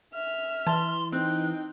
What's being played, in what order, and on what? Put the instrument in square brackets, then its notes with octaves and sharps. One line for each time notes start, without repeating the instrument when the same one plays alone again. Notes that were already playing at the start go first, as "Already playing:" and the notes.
[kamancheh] E5 F6
[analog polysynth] E3 [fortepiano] A5 [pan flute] C6
[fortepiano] C4 [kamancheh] D#4 G5 [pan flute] F#6